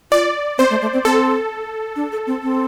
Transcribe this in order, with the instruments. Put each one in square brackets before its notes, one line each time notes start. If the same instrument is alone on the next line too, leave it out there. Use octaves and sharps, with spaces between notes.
[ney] F4 [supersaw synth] D5
[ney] C4 [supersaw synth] C5
[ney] A3
A3
C4
[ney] C4 [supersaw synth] A4
[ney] D4
A4
C4
C4